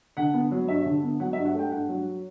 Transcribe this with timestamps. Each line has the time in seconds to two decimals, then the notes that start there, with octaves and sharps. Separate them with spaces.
0.17 D3 F#5
0.33 B3
0.51 F#3
0.68 G2 E5
0.85 D3
1.03 B3
1.20 F#3 F#5
1.33 E5
1.37 G2
1.45 F#5
1.54 A3
1.59 G5
1.71 G2 F#5
1.89 F#3